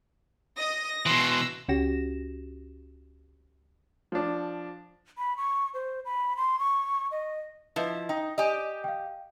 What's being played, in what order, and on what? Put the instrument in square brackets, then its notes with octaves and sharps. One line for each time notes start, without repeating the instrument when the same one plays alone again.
[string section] D#5 D#6 [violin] A#6
[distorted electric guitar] B2 E3 [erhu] C6 [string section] E6
[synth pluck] C#2 C#4 F#4 G4 A#6 E7
[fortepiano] F3 D4
[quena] B5
C#6
C5
B5
C6
C#6
D#5
[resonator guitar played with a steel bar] F3 E4 [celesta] B4 D#5
[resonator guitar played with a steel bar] D#4 [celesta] G5
[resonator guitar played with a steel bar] G4 D#5 [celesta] D5 G#5
[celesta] F5 G5